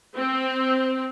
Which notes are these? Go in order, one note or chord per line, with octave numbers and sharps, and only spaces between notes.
C4